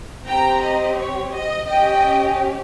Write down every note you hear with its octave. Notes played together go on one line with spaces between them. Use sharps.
C4 G4 G5 A#5
D#5
C#5
D#5
C#4 G4 D#5 G5